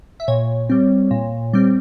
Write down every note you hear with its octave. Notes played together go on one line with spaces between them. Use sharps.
E5
A#2 C#5
G3 C4
A#2
G3 C4